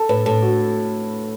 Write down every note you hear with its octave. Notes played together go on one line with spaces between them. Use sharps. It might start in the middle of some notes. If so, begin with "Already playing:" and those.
Already playing: A4
A2 B4
A2 A4
F#4